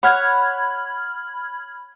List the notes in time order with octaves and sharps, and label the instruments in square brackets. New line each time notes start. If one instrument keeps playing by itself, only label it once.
[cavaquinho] C#5 F#5 [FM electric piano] B5 F6 G#6